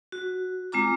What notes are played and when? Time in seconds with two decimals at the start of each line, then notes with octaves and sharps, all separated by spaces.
0.12 F#4
0.72 G#3 C4 F4 A#5 D6